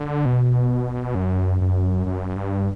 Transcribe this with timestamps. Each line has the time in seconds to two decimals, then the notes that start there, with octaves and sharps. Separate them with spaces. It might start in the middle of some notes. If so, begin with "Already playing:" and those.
Already playing: D3
0.26 B2
1.15 F#2
1.61 F#2
2.07 F#2
2.36 G2